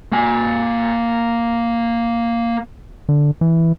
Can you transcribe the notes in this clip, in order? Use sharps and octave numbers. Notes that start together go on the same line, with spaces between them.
A#3 G#5
D3
E3